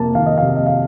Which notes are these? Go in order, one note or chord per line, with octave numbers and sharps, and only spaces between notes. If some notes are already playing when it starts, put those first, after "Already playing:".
Already playing: F2 C3 A#3 A5
D#3 F5
D#5
C3 F5
D#5
F5